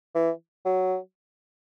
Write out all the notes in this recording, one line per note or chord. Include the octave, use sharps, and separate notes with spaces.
E3
F#3